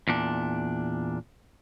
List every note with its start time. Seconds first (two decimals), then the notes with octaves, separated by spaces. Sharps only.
0.08 E2 A#2 D4